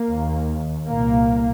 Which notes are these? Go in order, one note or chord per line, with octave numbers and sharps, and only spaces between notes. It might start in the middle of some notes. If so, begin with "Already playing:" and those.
Already playing: A#3
D#2
C2 A#2 A#3